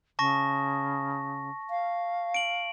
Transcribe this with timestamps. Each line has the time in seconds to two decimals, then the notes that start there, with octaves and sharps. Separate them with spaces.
0.19 C#3 A5 C#6 A#6
1.70 F5
2.34 D7 F#7